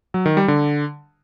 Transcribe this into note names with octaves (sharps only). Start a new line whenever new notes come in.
F#3
D#3
G3
D3